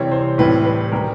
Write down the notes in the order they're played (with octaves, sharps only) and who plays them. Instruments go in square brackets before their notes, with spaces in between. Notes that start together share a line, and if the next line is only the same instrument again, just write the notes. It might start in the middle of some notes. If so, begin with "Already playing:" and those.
Already playing: [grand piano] C3 E3 G3 C4 C#5
C5
A2 E3 G3 C4 B4
B4
D#3 G3 B3 A#4